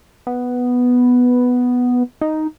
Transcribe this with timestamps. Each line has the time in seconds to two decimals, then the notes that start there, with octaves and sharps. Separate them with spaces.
0.27 B3
2.21 D#4